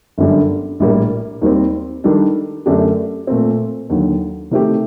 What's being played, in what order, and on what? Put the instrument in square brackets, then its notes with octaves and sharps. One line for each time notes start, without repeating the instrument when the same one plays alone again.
[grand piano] G1 F#2 D3 G3
A#1 A2 G3 A#3
D#2 D#3 G3 C4
D#3 G3 D4 A4
F#2 D3 A3 D4 G4
A#2 A3 C4
D#2 D3 F#3
C3 D#3 A3 C4 G4